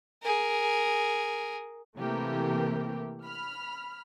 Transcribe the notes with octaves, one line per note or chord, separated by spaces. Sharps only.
G#4 A#4
C3 E3 A3 A#3 G4 A#4
B5 F6